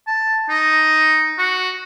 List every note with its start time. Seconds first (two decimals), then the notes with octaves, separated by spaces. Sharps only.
0.08 A5
0.50 D#4
1.38 F#4